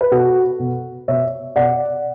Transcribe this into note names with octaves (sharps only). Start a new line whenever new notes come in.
B4
B2 F#4 A4
B2
B2 C#5 E5
B2 D5 F#5